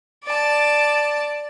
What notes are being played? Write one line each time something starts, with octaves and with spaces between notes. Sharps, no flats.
D5 A5